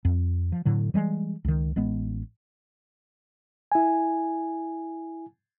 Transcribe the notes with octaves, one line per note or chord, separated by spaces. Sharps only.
F2
F3
A2 D3 F#3
E3 G3 G#3
C#2 D#3
A1 G#3 B3
E4 G#5